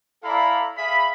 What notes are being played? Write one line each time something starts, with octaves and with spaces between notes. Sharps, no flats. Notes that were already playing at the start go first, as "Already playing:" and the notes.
E4 A4 D5 F5 A#5 B5
G#4 E5 F5 B5